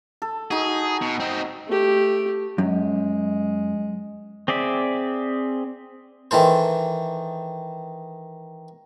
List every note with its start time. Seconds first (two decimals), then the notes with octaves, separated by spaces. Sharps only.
0.22 A4
0.51 D#4 F#4 G#4
1.02 B2
1.20 C4 D#4
1.68 A3 G4
2.58 F#2 G#3
4.48 C4 G#4 D5 E5
6.31 D#3 E3 A4 C5